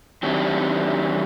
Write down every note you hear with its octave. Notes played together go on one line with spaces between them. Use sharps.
D#3 F#3 C4 D4 E4 G4